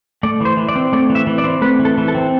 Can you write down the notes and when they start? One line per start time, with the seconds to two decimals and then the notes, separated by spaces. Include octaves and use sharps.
0.23 A3 D5
0.40 E3 C5
0.57 E3
0.69 D5
0.76 C4
0.93 A3 D5
1.10 E3
1.15 E5
1.27 E3
1.38 D5
1.44 C4
1.61 A3 B4
1.79 E3
1.85 A4
1.98 E3
2.08 A4
2.15 C4